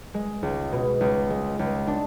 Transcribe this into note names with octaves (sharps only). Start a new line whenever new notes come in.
G#3
C#2
B2
C#2
G#3
C#2
D4